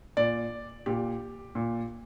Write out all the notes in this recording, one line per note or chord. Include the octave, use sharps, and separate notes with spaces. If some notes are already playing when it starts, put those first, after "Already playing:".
A#2 D5
A#2 G4
A#2